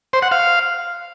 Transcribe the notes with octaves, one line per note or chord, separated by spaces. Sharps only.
C5
F#5
F5